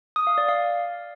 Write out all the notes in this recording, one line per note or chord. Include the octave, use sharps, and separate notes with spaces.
D#6
F5
D5
F5